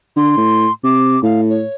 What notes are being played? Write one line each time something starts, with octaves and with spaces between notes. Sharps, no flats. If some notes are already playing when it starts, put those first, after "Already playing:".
D3 C6
A2
C3 D6
A2 F5
C#5